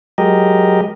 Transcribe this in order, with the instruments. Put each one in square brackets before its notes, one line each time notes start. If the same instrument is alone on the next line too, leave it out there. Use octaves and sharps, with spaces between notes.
[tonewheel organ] F#3 G#3 G4 A#4 D#5